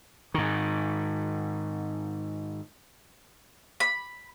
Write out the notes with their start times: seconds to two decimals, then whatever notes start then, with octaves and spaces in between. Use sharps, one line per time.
0.34 G#2 D#3
3.80 B5